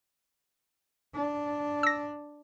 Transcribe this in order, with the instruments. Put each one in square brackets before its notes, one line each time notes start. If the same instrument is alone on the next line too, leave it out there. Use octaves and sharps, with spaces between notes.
[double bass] D4
[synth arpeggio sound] E6 A#6